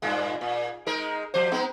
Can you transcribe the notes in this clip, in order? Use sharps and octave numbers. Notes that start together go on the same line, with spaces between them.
G2 A#2 G#3
A#2
G#3 D#4 A#4
F3 C5
G#3 B3 D#4